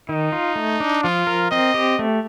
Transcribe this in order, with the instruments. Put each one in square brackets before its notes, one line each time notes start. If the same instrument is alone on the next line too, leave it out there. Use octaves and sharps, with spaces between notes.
[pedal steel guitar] D#3 [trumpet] D#4
[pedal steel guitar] F4
A3
D4
[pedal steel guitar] F3 [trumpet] F4
[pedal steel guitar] A#4
[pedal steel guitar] C4 [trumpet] D#5
[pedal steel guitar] G4
A3